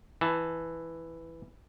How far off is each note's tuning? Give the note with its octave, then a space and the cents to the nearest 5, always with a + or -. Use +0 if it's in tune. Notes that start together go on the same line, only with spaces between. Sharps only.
E3 +0 A5 +0